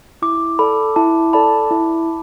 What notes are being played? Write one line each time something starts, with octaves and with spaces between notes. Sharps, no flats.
E4 D6
A4 D5 A5 B5
E4 A5
A4 D5 A5 B5
E4